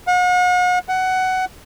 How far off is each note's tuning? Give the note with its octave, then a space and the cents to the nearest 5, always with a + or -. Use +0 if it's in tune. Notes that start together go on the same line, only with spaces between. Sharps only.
F#5 -40
F#5 +15